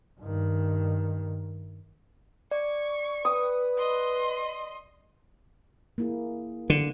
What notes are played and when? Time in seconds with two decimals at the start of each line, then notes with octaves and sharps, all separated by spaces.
0.20 G2 D#3
2.51 D5 C#6
3.25 B4 D#6
3.78 D#5 C6
5.98 A#3 E4 G#4
6.70 D3 B3